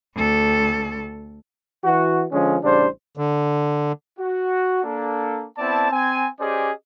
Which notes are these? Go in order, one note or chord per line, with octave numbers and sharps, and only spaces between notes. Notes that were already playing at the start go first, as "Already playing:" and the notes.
D2 A4
E3 F#4
D3 F3 G#3 C#4
A1 C#3 G3 D4 C5
D3
F#4
A#3 D4 A4
B3 C4 E4 D5 A5
C4 G#5
C#4 G4 G#4 C5 D5 D#5